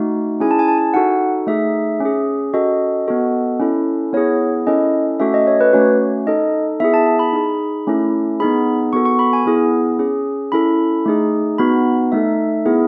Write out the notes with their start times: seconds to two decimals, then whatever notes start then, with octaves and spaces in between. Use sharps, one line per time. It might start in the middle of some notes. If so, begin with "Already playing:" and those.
Already playing: A3 D#4 F#4
0.40 C#4 E4 G#4 G#5
0.51 A5
0.59 G#5
0.68 A5
0.78 G#5
0.94 D#4 F#4 A4 F#5
1.47 A3 D#4 G#4 E5
2.00 C#4 G#4
2.54 C#4 F#4 A4 D#5
3.08 B3 F#4 A4
3.60 C#4 E4 A4
4.13 B3 E4 G#4 C#5
4.67 C#4 E4 A4 D#5
5.20 A3 C#4 F#4 A4 E5
5.34 D#5
5.47 C#5
5.61 B4
5.73 A3 C#4 F#4 C#5
6.27 D#4 A4 D#5
6.80 B3 E4 G#4 E5
6.94 A5
7.07 A5
7.19 B5
7.33 D#4 G#4
7.87 A3 C#4 E4 A4
8.40 B3 D#4 G#4 B5
8.93 B3 F#4 A4 C#6
9.05 C#6
9.19 B5
9.33 G#5
9.46 B3 E4 G#4
9.99 C#4 G#4
10.52 C#4 E4 A4 B5
11.05 A3 D#4 G#4
11.58 B3 D#4 F#4 B5
12.12 A3 D#4 A4 E5
12.66 B3 E4 G#4